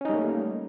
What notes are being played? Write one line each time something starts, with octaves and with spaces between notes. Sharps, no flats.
G3 A3 A#3 C#4 D#4